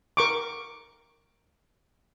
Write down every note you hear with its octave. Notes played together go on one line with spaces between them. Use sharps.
A#4 C#6 D6